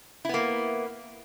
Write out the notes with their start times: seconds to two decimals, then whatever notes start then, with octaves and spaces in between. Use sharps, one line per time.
0.25 E4
0.29 B3
0.34 A#3